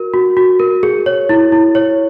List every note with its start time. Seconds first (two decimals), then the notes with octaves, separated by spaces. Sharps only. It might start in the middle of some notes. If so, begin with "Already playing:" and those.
Already playing: F#4 A#4
0.13 F#4
0.37 F#4
0.60 A#4
0.83 G#4
1.06 C#5
1.29 E4
1.52 E4
1.75 C#5